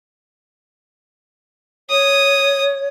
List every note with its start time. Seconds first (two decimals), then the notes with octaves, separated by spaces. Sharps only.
1.90 C#5 D#6